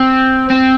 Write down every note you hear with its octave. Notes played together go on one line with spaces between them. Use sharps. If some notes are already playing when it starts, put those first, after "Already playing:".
Already playing: C4
C4